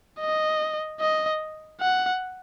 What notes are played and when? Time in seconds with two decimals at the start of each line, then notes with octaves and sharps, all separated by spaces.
0.20 D#5
1.00 D#5
1.81 F#5